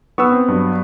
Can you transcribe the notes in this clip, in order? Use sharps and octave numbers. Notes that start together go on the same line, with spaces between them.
B3 C#6 E6
C4
G2 F#3